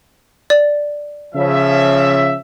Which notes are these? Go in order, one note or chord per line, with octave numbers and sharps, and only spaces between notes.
D5
C#3 F3 E5